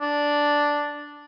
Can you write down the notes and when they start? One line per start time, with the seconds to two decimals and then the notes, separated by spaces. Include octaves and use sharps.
0.01 D4